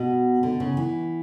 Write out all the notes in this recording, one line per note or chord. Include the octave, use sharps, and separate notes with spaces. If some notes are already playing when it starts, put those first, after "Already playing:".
Already playing: B2
D3
C#3
E3